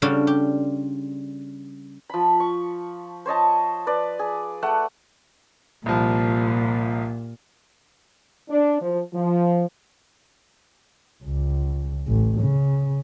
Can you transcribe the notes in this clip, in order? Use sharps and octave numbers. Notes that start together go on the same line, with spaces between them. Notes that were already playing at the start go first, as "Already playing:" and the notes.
C#3 G3 D4 F4 F#4 A4
G4
F3 B5
C#6
C5 C#5 D#5 A5
B4 D5
G#4
A3 F#5
C2 A#2 F3
D4
F3
F3
C#2
A1
C#3